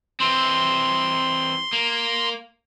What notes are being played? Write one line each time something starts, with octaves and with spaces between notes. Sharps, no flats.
E3 C4 C6
A#3